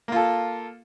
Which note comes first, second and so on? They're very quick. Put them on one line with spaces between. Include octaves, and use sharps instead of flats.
A#3 F4 A4